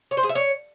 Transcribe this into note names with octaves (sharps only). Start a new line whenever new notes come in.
C#5
C5
G#4
E5
C#5